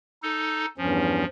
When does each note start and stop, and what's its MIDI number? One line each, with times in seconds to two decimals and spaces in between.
0.23 0.66 63
0.23 0.66 69
0.78 1.24 40
0.78 1.24 43
0.78 1.25 53
0.78 1.24 61